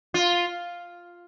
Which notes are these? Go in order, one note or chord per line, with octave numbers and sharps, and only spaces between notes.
F4